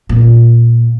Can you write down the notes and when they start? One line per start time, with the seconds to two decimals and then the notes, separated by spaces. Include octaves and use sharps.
0.09 A#2